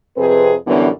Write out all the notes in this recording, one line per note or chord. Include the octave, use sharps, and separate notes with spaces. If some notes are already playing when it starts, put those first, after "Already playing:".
F2 C3 C4 G#4 B4
F#2 D3 E3 G3 B3